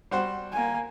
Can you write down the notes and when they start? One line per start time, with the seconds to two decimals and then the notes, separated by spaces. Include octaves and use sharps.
0.11 G3 F#4 C5
0.52 A#3 G#5